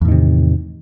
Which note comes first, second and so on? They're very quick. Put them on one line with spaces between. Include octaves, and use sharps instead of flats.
E2 A2 D#3 C3